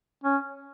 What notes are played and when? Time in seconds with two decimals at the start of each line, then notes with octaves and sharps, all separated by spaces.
0.24 C#4